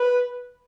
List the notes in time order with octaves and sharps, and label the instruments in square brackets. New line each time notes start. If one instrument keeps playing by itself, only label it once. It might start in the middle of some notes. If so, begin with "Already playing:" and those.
Already playing: [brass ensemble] B4